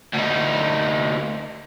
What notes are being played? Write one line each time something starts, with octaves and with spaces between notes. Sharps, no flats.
D2 D#4